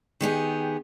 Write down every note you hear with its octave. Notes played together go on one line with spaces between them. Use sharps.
D#3 B3 G4 G#4